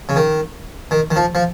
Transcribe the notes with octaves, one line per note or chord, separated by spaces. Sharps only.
C#3
D#3
D#3
D#3
F3
F3